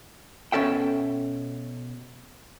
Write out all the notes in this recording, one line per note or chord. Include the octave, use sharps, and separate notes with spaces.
B2 C#4 A4 E5 G5